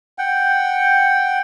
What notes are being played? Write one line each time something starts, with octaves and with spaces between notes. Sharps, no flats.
F#5 G5